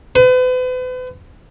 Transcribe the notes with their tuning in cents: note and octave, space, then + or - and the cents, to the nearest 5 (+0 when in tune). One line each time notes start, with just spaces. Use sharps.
B4 +40